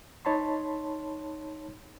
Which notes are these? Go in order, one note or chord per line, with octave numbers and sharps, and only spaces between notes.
D#4 C#5 A5 B5 C6